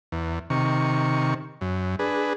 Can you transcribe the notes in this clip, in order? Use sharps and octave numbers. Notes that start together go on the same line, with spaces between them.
E2
C3 D#3 C#6
F#2
D4 G#4 B4